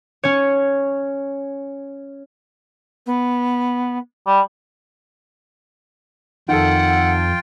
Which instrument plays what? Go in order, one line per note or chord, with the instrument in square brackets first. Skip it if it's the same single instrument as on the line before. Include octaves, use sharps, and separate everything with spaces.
[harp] C#4 C#5
[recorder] B3
[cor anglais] G3
[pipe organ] F2 [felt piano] D#3 A4 [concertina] F4 G5 [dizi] F#5